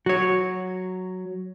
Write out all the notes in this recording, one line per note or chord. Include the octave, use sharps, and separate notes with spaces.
F#3 F#4 C#5